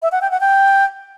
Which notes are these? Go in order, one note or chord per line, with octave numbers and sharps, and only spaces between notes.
E5
F#5
G5
F#5
G5